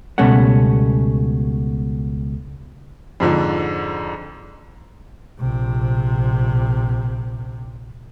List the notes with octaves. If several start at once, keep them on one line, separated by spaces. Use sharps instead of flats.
C#2 B2 G3 A3 C#4 F#5
F2 G#2 D3 F3
A#1 C3